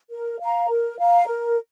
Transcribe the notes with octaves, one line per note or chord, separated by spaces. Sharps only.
A#4
F5 A#5
A#4
F5 A#5
A#4